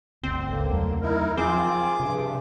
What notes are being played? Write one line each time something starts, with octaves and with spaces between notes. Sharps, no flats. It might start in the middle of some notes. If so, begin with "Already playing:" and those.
G1 D2 C4
C#2 D3 A#3
E2 F#3 A3
D#4 E4 A#4
F3 C4 F4 G#4 D6
G2 C3